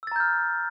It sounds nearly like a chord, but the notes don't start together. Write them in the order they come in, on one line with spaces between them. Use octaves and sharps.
E6 A6 A#5 G6 F6